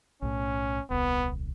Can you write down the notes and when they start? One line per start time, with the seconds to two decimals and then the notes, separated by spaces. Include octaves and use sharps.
0.22 B1 A2 C#4
0.90 D#1 C2 B3